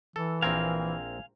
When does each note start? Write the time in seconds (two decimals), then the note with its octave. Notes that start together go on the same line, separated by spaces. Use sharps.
0.16 E3 A4
0.42 A#1 C4 A#4 F5 G#5